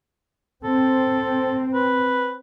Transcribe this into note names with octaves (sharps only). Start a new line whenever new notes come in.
C4 A4
B4